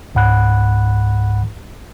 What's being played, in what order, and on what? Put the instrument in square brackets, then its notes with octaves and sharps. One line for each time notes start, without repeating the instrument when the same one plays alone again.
[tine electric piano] C#2 G#2 F#5 B5 F#6